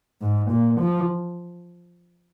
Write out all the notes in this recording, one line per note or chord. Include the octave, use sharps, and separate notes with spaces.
G#2
A#2
F3